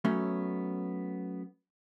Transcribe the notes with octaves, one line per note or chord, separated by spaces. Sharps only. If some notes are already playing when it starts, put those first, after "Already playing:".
F#3 A3 B3 C#4